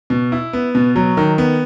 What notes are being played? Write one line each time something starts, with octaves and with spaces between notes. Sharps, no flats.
B2
E4
B3
B2
F#3
D#3
B3